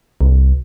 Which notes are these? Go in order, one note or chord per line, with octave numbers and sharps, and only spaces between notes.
C2